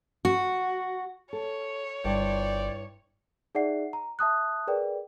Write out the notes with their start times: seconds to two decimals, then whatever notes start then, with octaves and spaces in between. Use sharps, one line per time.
0.25 F#4
1.33 A4 C#5
2.04 G1 G2 E4 F4 C5 D5 G5
3.55 D#4 G#4 D5 E5 F#5 C7
3.93 A#5
4.19 E5 A5 D#6 F#6
4.68 G#4 A#4 B4 D5 G5